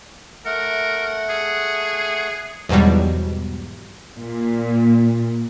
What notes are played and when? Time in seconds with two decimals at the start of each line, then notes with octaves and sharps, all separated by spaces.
0.46 A3 A#4 F#5
1.30 G#4
2.69 E2 G#2 B2 F#3 G3
4.18 A#2